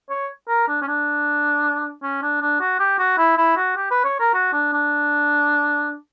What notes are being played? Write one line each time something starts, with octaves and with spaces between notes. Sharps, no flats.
C#5
A#4
D4
C#4
D4
C#4
D4
D4
F#4
G4
F#4
E4
E4
F#4
G4
B4
C#5
A#4
F#4
D4
D4